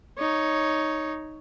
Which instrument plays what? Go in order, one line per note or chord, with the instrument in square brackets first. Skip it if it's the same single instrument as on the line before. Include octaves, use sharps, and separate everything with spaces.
[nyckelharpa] D#4 C#5